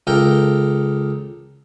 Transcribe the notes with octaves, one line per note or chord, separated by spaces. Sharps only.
C#2 A4 A#4 G5